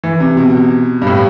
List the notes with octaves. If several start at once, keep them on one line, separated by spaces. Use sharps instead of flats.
E3
C3
B2
G2
A2